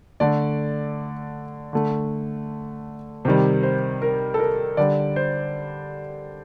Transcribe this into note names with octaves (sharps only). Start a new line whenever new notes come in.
D3 A3 D5
D3 A3
C3 D#3 G3 C5
C5
A#4
A4
A#4
D3 G3 D5
C5